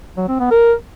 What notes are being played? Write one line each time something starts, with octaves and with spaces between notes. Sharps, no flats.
F#3
C4
B3
A#4